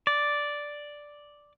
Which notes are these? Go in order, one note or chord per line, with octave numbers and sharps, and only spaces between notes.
D5